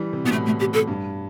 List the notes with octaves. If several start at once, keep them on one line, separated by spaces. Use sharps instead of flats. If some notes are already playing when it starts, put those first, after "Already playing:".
Already playing: E3 G3
C3
B2 B3
A2 A3
A3
G4
A4
G2